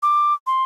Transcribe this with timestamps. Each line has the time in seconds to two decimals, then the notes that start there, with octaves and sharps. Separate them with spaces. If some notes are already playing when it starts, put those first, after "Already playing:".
0.03 D6
0.47 C6